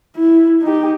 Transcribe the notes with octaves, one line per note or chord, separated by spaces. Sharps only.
E4
D#4 G4